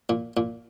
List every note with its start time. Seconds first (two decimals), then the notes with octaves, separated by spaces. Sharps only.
0.09 A#2
0.37 A#2